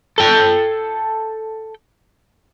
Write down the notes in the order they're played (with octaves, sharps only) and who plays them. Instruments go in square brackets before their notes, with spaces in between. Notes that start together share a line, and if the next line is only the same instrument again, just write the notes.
[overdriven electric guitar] A4 G5